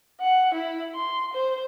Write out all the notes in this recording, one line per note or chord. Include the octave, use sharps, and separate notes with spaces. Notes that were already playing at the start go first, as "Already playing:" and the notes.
F#5
E4
C6
C5